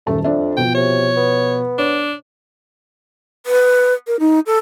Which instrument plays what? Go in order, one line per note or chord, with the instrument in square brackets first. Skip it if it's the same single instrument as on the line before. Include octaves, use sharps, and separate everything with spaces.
[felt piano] D#1 F#2 A5 [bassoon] A3
[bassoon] F2 [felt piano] D4 E5
[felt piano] B2 F3 [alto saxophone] G5
[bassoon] C3 [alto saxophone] C#5
[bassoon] B3
[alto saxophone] D4 [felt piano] C#5
[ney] B4
A#4
D#4
A4